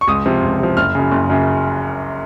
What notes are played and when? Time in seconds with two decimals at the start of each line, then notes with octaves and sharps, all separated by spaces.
0.01 C#6
0.08 C#2 D#6
0.26 C3 F3
0.43 C#2
0.60 C3 F3
0.77 F#1 F6
0.95 F#2 C#3
1.12 F#1
1.30 F#2 C#3